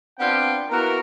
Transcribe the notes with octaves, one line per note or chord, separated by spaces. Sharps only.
B3 C4 D4 F4 G5
A#3 B3 E4 F#4 A#4